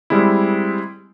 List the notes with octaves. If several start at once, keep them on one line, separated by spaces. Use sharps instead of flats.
G3 G#3 C4 E4